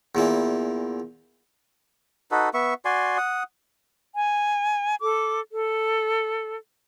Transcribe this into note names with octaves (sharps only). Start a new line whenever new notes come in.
E2 A#2 E3
D#4 F#4 A4 B4
B3 E5 C#6
F#4 D5 G#5 C6
F#5 D#6
G#5
A4 D6
A4